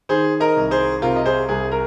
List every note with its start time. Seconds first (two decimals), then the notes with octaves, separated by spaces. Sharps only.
0.09 D#3 G#4 C5
0.40 A#4 D#5
0.56 C2
0.71 G#4 C5
1.02 C3 F4 A#4
1.16 D#5
1.26 G#4 C5
1.49 C2 G#4
1.71 A#4